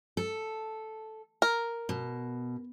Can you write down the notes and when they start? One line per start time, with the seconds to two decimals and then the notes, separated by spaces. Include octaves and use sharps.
0.17 A4
1.42 A#4
1.89 B2